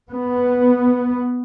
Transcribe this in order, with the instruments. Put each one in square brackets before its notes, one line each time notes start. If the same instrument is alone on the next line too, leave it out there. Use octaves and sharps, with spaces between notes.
[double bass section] B3